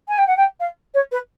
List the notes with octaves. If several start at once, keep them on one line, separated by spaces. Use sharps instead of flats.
G#5
G5
F#5
G5
F5
C#5
B4